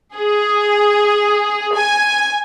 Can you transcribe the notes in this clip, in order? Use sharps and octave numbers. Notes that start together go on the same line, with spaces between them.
G#4
G#5